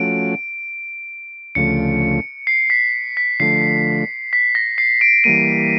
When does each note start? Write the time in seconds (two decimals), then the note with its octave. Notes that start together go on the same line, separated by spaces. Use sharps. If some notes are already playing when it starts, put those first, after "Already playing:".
Already playing: F3 A3 C#4 F#4 D7
1.55 D2 C#3 F3 A3 C#7
2.47 C7
2.70 B6
3.17 B6
3.40 D3 F3 A3 C7
4.33 B6
4.55 A#6
4.78 C7
5.01 D7
5.24 E3 G3 A#3 D#7